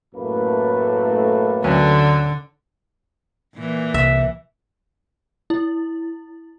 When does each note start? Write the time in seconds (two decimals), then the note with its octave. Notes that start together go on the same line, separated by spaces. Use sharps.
0.15 A1 F#2 A2 A3 A#3 B4
1.64 D2 D3 F#3 C#4
3.55 A#2 E3
3.94 C2 E5
5.50 E4